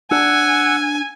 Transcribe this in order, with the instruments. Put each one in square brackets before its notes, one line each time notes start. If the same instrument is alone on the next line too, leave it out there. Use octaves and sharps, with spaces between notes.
[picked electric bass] D4 [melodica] F#5 E6 [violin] G#5